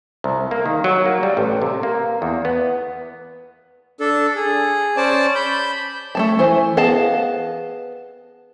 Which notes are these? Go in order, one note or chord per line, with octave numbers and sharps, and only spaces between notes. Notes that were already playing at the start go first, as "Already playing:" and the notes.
C2
A#3
D#3
F#3
A#3
G3
A1
C3
A#3
E2
B3
D4 A4
G#4
C#4 C5 D5 A5
B5 G6
A3 A#3 A5
E3 C5
B3 G#4 D#5 F5 A5